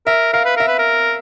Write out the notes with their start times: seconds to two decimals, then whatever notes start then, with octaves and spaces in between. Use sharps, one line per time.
0.06 A#4 E5
0.33 A#4 F5
0.45 B4
0.57 A#4 E5
0.67 B4
0.79 A#4